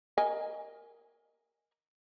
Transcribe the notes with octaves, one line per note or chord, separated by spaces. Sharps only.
A#4 D#5 G#5